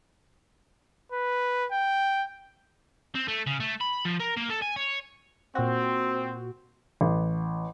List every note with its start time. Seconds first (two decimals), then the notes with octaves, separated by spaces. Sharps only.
1.12 B4
1.72 G5
3.15 C4
3.28 A3
3.47 C#3
3.60 A3
3.81 B5
4.05 F3
4.20 A#4
4.37 A#3
4.50 A4
4.62 G#5
4.76 C#5
5.55 A#2 C4 F#4
7.01 A1